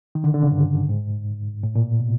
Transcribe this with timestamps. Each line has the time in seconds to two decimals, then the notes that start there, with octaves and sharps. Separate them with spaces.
0.15 D#3
0.24 D3
0.34 D3
0.43 C#3
0.51 G2
0.89 G#2
1.63 A2
1.75 A#2
2.00 B2